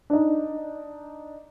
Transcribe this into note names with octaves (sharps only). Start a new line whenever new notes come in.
D4 D#4